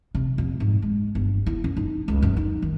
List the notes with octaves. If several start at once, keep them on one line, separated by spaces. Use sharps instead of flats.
C3
F2
G#2
G#3
G1
E4
F#2
D#4
C#2
F#2
D#4
D#3